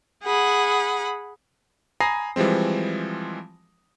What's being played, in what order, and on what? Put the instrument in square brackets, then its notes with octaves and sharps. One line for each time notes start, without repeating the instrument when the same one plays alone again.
[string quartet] G#4 F#5 B5
[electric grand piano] G#5 A#5 B5 D#6 A#6 C7
E3 F3 G3 G#3 C4